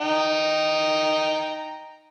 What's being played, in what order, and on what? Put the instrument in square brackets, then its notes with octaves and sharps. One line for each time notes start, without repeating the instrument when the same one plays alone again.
[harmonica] D#4 G5 A#5